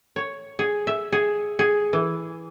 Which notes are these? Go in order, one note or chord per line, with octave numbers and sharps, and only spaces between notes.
C#5
G#4
E5
G#4
G#4
E3